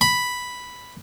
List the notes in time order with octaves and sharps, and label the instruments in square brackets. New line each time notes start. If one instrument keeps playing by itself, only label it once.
[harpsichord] B5